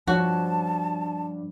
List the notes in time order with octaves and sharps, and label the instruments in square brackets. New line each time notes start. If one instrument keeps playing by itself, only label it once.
[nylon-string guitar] G2 [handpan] F3 C#5 [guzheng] F#4 [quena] A5